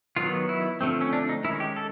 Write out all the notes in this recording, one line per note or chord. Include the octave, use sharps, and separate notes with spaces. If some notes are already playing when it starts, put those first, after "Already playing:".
D#3 F#3 B3 F4
E4
D3 F3 A3 C4
C#4
D4
D#4
D#3 G#3 C#4 E4
G4
A4